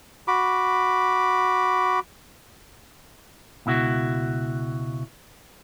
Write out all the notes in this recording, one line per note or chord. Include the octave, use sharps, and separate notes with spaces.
F#4 B5 D6
C#2 B2 E4 F#4